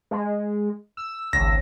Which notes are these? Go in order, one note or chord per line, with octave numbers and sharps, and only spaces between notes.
G#3
E6
G#1 C#2 A#6